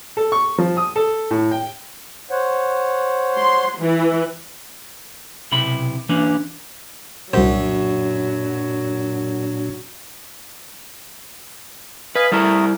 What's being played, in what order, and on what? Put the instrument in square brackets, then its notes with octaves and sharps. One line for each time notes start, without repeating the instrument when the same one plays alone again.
[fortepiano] A4
C#6
F3
D#6
A4
A2
G5
[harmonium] C5 C#5 F#5
[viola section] C6
E3
[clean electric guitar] B1 C3 E4 B5
E3 A#3 C#4 D4
[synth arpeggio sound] C2 C5 [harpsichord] F#2 [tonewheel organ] A#2 D4 [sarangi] F#3
[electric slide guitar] B4 [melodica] D#5 F5 G#5
[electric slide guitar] G3 E4 [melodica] A3 A#4 D#6